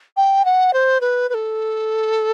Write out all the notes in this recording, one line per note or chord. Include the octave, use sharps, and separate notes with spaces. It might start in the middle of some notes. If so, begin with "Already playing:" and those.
G5
F#5
C5
B4
B4
A4